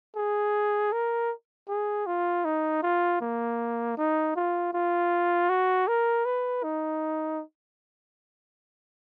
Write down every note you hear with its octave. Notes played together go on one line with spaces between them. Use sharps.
G#4
A#4
G#4
F4
D#4
F4
A#3
D#4
F4
F4
F#4
A#4
B4
D#4